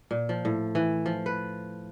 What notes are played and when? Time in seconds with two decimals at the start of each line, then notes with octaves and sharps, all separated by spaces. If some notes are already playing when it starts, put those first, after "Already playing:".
0.11 A#2
0.29 F3
0.45 A2
0.75 E3
1.06 F3
1.26 B4